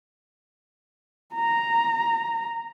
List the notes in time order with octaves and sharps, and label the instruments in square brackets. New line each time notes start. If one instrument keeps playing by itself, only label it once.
[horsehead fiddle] A#5